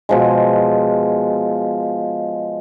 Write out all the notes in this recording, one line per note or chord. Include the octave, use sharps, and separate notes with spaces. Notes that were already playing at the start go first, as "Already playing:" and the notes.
B2 F3 G#3